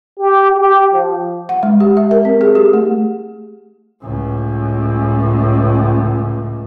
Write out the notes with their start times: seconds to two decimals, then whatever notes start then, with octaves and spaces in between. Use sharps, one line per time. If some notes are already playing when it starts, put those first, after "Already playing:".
0.19 G4
0.57 G4
0.93 F3
1.49 F#5
1.63 G#3
1.80 G4
1.97 E5
2.11 A#4
2.25 C4
2.41 G#4
2.55 G4
2.73 A3
4.01 C#2 A2